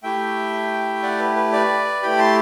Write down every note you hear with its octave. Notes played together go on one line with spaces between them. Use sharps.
A3 E4 G4 E5 G5
D5 F#5
B4
B4
B4 D5
A3 E4 G4 G5 B5
A5 C6